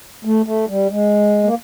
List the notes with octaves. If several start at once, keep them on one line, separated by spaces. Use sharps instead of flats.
A3
A3
G3
G#3
A#3